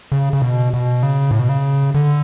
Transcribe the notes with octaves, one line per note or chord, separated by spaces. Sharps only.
C#3
C#3
B2
B2
C#3
A2
B2
C#3
D3